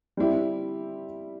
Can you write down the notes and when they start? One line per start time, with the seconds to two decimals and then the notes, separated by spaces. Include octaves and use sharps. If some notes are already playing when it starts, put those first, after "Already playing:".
0.17 G3 C4 E4 G4